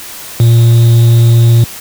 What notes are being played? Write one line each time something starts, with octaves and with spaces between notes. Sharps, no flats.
A#2